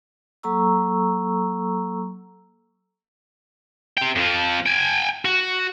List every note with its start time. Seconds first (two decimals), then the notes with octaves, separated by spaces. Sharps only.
0.43 F#3 A#3 A4 A#5 C#6 E6
3.98 C3 G5
4.16 F2 F3
4.66 G5 G#5
5.25 F#4